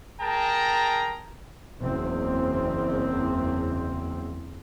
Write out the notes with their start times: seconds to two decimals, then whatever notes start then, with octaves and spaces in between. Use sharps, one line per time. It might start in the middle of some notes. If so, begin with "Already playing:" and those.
0.20 G#4 A#4 G5 A5 A#5
1.81 F#1 E2 C4